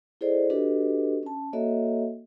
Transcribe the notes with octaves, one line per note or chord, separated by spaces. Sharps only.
E4 G#4 A4 C5 D5 D#5
D4 F#4 G4 A4 B4 D#5
C#4 A5
A#3 F#4 A4 C#5 D#5 E5